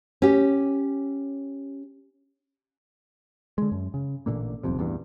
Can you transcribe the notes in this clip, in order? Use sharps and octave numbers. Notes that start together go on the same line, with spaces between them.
C#4 G4
D3 G#3
F#2
C#3
A1 A#2 D3 A#3
D#1 B1 F2 C3
A1 E2 G2